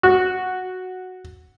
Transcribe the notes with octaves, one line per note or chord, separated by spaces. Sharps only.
F#4